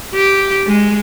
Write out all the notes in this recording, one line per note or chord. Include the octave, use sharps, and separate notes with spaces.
G4
G#3